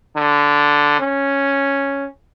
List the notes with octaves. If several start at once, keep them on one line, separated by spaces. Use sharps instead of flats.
D3
C#4